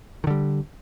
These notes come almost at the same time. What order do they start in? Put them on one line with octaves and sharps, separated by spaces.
D#3 D3 G3